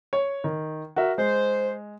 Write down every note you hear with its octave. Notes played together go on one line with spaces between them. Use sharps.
C#5
D#3
F#4 A#4 E5
G#3 C5